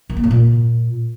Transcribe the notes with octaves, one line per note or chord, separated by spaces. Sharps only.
D#3
A#3
G#2
A#2